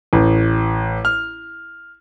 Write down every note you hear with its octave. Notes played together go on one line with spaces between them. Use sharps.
A1
F6